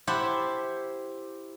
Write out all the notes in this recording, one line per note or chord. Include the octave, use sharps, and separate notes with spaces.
E4 G4 C5 E5 F#5 A5